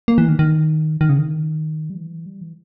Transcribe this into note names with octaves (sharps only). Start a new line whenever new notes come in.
A#3
E3
D#3
D#3
D#3
C#3
D#3
G3
E3
G3
E3